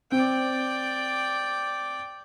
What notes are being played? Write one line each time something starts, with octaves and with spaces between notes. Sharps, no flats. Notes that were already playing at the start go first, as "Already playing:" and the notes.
C4 D5 G5